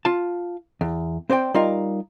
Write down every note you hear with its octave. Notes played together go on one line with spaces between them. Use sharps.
F4 A5
E2
C4 C5 D5 G5
G3 D#4 F4 A#4 F5